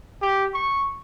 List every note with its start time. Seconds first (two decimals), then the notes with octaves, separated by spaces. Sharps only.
0.22 G4
0.54 C#6